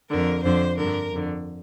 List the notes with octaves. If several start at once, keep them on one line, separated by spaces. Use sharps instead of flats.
F2 D3 A#4
F2 D3 C5
G2 D3 A#4
F2 D3